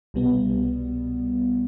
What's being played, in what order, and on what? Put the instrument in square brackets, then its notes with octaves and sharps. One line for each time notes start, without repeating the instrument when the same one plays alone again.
[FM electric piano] C2 B2 G3 B3